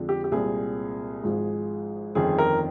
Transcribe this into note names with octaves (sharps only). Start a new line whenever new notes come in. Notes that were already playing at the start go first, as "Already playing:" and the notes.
Already playing: F2 D3 F3 G#3 C4
G4
G4
C2 A#2 G#3 C4 G#4
G#1 G#2 F3 G#3
G1 F2 D#3 G#4
A#4